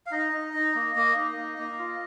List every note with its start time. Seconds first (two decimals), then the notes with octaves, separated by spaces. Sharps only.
0.06 F5
0.12 D#4 D#5
0.33 D#4
0.54 D#4
0.75 A#3
0.96 A#3
1.16 D#4
1.37 A#3
1.58 A#3
1.79 F4